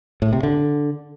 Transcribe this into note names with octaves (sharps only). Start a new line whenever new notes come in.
A2
C3
D3